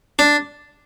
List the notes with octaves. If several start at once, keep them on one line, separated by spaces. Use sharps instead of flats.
D4